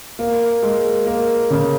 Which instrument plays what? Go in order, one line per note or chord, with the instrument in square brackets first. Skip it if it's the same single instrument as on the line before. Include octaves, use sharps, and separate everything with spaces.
[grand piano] A#3
G#3
A#3
C#3